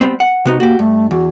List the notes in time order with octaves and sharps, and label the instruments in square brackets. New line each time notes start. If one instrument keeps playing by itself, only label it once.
[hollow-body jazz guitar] G3 B3 C4
F#5
[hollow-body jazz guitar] C3 B3 D#4 [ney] F#4
[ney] A#3 [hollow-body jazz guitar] F#4 G4
[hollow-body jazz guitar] G2 [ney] A3
[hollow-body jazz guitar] E2 [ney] F#4